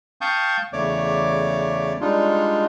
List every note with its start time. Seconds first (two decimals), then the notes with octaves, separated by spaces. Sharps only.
0.21 F5 G5 A5 C#6 D#6 G6
0.73 E2 C#3 A3 C#5 D5 D6
2.01 G3 G#3 D4 D#4 F4